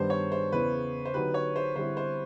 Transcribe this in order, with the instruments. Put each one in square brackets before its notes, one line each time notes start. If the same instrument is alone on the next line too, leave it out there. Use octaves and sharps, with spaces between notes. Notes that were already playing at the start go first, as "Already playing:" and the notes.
Already playing: [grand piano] G2 D#3 G3 B3 D4 [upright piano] C5
[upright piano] C#5
C5
[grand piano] E2 C#3 E3 [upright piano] B4
[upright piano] C5
[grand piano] D3 F#3 B3 D#4 G4 [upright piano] B4
[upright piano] C#5
C5
[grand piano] D3 G3 C4 E4 [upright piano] C5
[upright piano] C5